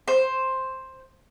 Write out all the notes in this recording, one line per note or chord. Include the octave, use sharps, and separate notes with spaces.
C5